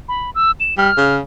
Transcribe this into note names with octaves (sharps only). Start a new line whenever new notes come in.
B5
E6
E7
G3 F6
C#3